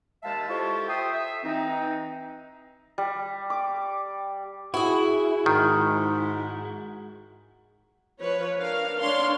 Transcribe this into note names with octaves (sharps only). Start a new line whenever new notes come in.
D#2 G#3 E5 F5 A5
E4 F4 G4 A4 C5 C#6
A4 E5 G5 C6 D#6
E5
E3 C4 D#4
G3
D6
E4 F#4 G#4
G#2 D#3
F3 B4 C#5
D4 A#4 F5
D4 C#5 F5 C6